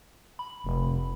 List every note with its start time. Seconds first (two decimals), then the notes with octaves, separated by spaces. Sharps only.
0.39 B5
0.64 F1